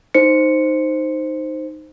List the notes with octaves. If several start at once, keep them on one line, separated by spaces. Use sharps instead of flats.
D#4 C5 C#7